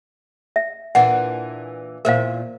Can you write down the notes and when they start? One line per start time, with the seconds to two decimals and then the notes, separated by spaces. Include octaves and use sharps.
0.56 E5
0.95 A#2 E3 D4 F#5
2.05 E2 A#2 A#4 C5 E5 F5